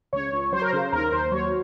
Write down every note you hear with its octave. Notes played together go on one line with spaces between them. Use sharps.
C#2 C#5
C#2
F#3 C5
A#4
C#3 C5
D#2 A#4
D#2 C5
F#3 C#5